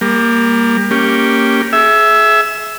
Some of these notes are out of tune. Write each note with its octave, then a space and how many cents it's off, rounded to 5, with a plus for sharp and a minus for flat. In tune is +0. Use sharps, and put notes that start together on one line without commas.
G3 +30 A#3 +0
A#3 +0 C#4 +0 G4 +0
G#4 +30 E5 +0